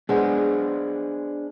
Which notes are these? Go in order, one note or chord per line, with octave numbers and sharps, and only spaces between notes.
G#3 B3 D4 G#4 C5